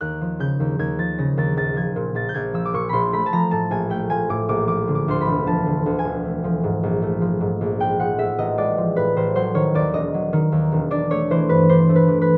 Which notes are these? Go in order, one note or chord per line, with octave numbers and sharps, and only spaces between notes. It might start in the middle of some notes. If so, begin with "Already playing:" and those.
D#2 F#6
F3
C#3 G6
D#2
D#2 G#6
F3 A6
C#3 A#6
D#2 A6
A#1 A6
F3 G#6
A#2
A#1 A6
G6
A#1 G#6
F3 E6
D6
A#2 C#6
A#1 B5 C6
A3 B5
A5
F3 A#5
A2 A5
A#1 G#5
A3 G5
F3 G#5
A2 D6
A#1 D6
F3 D6
D3
D6
D2 C6
B5
E1
F3 A5
D3
D2
G#5
E1
A3
F3
G#2
A#1
A3
F3
G#2
A#1
G#3 G5
F3 F#5
A2 E5
A1 D#5
G#3 D5
F3
A2 B4
A1 C5
F#3 C5
D#3 C#5
D#2 D5
E1 D#5
F#3
D#3
D#2
E1
D4 D5
A3 C#5
E3 C5
G2 B4
D4 C5
A3
B4
E3
B4